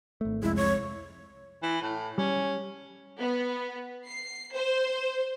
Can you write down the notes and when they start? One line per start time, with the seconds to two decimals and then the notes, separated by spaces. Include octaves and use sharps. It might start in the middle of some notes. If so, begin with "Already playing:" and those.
0.21 G#1 A3
0.43 C2 F2 G#3 E4
0.56 C#5
1.63 E3
1.82 A2
2.18 G3 C#4
3.18 B3
4.07 C7
4.54 C5